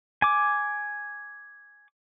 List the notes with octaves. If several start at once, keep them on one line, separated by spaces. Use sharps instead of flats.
G#5 D6